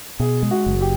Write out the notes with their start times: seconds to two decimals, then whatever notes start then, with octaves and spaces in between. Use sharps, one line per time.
0.20 B2 G#4
0.43 G#3
0.51 F#4
0.66 F#1
0.81 G4